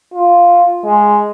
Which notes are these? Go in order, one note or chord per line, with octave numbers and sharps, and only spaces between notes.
F4
G#3